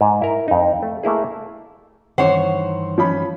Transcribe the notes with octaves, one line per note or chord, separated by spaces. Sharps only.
G#2
E4 A#4
F2 D#4
A3
A3 A#3 E4 G#4
G2 D#3 E3 C5 C#5 F#5
F3 C#4 B5